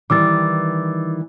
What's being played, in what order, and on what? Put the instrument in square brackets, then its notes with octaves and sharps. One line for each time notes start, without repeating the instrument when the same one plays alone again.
[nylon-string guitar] D#3 E3 G3 [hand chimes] D6 E6 A6